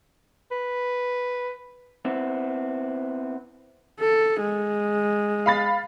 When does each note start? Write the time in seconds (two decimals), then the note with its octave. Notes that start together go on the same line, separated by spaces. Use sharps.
0.51 B4
2.05 B3 C4 E4
4.00 A4
4.41 G#3
5.46 F5 B5 A6